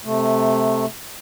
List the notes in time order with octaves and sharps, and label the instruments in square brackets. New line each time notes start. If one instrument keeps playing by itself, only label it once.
[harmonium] C3 A3